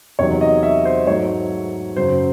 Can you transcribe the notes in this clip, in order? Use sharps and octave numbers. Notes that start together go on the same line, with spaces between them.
E2 C3 D#3 F#3 C#5
D#5
E5
C5
G#2 F#3 A3 C#5
F#2 C#3 F#3 C5